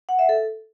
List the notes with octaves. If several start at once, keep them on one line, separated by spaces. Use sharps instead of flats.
F#5
E5
A4